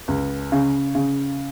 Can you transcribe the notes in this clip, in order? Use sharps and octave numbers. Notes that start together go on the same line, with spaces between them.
C#2
C#3
C#3